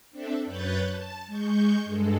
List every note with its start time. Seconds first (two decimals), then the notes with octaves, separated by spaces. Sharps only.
0.11 C4 D4 A4 E5
0.45 F#2 B4 C#5 F#6 G6 A6
0.88 A5
1.27 G#3 C#6 G6
1.85 G2 G#3 A4